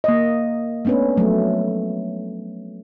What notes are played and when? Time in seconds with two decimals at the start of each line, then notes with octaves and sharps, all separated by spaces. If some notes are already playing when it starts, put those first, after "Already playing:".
0.04 A#3 D#5
0.85 A3 B3 C#4 D4 B4
1.17 F3 F#3 G#3 A3